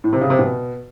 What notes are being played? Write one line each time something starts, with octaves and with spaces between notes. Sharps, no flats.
A2
C3
C#3
C3
B2